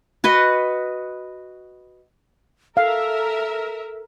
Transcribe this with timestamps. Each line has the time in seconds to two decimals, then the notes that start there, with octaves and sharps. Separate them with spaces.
0.24 F#4 B4 D#5 F#5
2.77 A4 A#4 E5 F5